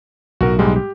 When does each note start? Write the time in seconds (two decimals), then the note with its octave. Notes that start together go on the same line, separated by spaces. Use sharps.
0.41 B1 A2 F#4 A#4
0.59 G#2 G3 G#3
0.76 G4